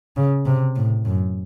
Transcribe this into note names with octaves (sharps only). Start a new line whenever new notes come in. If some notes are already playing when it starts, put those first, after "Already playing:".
C#3
C3
A2
F#2